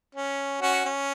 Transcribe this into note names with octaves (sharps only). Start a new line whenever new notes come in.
C#4
C#4 F#4
C#4